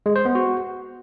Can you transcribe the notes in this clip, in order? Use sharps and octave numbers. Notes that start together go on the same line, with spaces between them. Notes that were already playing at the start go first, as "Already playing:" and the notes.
G#3
C5
B3
F#4